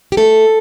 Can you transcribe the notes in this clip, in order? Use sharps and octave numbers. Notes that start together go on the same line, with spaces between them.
G4
A3 A4